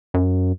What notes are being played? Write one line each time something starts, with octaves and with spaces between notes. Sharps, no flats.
F#2